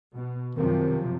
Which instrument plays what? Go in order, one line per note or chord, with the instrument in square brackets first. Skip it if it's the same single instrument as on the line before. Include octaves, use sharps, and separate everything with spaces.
[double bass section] B2
[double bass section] F#2 C3 F3 [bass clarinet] D#3